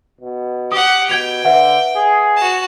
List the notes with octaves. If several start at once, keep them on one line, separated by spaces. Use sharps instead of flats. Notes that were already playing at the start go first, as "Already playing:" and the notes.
B2
G4 F#5 D#6
B2 G5 G6 G#6 F7
D3 B4 E5 F#5
G#4
F#4 A5